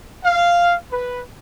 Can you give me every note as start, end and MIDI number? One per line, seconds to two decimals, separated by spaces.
0.25 0.74 77
0.90 1.20 71